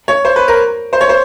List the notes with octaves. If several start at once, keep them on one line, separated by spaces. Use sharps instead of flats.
C#5
C5
B4
A#4
C5
C#5
C5